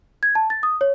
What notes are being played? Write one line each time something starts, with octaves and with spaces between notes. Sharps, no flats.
G#6
A5
A6
D#6
C#5